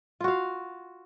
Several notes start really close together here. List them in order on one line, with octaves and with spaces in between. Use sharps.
F4 F#4 F5